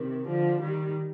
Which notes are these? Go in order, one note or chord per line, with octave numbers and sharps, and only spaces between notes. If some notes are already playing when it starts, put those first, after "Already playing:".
Already playing: C3 D#3
D3 F3
D#3 G3